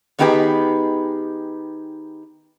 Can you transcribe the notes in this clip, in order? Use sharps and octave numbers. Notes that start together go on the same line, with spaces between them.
D#3 B3 D#4 G4 G#4 B4